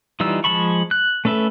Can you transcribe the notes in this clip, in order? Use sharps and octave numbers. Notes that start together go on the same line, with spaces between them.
E3 G3 D#4 F4 E6
F3 G#3 A5 B5 C#6
F#6
A3 C#4 A4 B4 E5